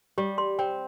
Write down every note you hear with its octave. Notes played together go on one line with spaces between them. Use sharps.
G3 G4
C6
C4 G5